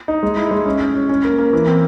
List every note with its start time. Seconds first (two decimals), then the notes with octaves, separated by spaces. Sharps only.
0.08 D#4
0.23 G#3
0.37 E4
0.51 G#3
0.66 C#4
0.80 C#4
0.95 C#4
1.09 C#4
1.24 A#3
1.39 A#3
1.53 E3
1.67 C4